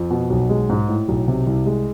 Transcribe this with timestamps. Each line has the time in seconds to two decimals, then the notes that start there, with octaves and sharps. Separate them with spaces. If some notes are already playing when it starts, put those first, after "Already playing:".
Already playing: F2
0.11 B2
0.30 B1
0.49 G#3
0.69 G#2
0.88 A2
1.08 B1
1.28 C3
1.47 C2
1.66 G#3